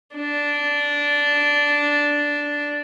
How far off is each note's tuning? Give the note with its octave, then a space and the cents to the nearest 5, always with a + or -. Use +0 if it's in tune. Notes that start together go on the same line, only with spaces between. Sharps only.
D4 -10